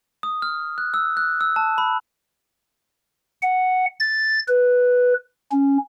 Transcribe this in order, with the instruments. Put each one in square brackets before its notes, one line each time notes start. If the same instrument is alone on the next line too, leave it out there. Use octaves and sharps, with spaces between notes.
[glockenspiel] D#6
F6
F#6
E6
F#6
E6
A5
B5
[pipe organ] F#5
A6
B4
C#4